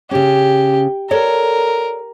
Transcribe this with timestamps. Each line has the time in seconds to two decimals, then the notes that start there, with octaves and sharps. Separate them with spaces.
0.11 C#3 C#4 G4
1.11 A4 A#4 C#5 D5